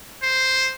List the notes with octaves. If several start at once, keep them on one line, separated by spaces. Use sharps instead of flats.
C5